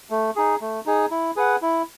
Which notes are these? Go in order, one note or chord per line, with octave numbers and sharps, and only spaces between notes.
A3
D#4 G#4
A3
D#4 G#4
E4
G#4 B4 F#5
E4